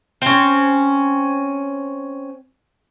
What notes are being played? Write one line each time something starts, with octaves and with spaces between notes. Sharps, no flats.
C4 C#4